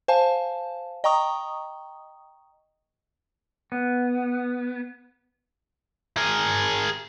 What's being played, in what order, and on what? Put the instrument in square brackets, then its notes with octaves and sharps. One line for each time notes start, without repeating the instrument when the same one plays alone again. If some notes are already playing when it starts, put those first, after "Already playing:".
[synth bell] C5 F5 G#5 A5
D#5 G5 A#5 C#6 D#6
[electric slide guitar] B3
[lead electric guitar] G#4 A#4